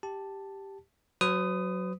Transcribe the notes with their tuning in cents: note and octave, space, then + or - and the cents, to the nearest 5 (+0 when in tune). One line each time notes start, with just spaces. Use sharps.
G4 +0 A5 +0
F#3 +0 B4 +40 D#6 +0